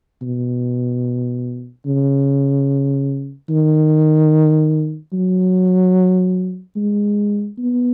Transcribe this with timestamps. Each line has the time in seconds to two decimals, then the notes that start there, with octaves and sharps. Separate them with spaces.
0.22 B2
1.86 C#3
3.50 D#3
5.13 F#3
6.76 G#3
7.58 B3